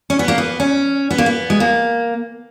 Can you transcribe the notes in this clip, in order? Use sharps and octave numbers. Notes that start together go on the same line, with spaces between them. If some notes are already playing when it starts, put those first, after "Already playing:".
C#4
B3
A#3
B3
C#4
B3
A#3
B3
G#3
A#3